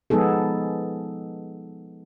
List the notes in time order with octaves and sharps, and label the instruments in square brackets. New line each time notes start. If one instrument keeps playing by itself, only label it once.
[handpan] F3 G#3 B3 D#4 G#4 A4